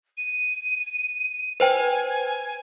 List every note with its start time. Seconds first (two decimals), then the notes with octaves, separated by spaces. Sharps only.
0.17 D#7
1.60 B4 C5 G5 G#5